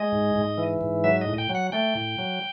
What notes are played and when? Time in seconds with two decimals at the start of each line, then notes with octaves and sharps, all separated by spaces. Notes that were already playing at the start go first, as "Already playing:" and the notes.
Already playing: G#3 D#5
0.12 G#2
0.35 G#2
0.58 E3
0.81 G#2
1.04 F#3 E5
1.21 D#5
1.27 A2
1.38 G5
1.49 F#3
1.55 F#5
1.72 A3 G5
1.95 A2
2.19 F#3